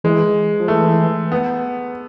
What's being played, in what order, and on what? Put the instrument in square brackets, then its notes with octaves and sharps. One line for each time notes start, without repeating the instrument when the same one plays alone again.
[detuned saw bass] E3 [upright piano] G#3
[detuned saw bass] F3
[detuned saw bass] E3 [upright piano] A3
[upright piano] B3